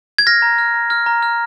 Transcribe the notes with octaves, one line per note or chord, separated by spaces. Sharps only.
G#6
F6 A#6
A#5
F6
A#5
F6
A#5
F6